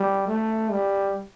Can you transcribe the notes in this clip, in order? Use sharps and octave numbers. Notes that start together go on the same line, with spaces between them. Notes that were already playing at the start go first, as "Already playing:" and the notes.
Already playing: G3
A3
G3